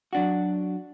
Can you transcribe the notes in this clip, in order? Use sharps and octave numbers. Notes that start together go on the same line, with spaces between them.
F#3 D4 F#4